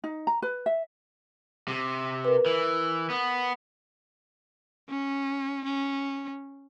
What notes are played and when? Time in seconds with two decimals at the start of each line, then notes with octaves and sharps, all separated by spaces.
0.04 D#4
0.27 A#5
0.42 B4
0.66 E5
1.68 C3
2.25 A#4 B4
2.46 E3
3.10 B3
4.89 C#4
5.64 C#4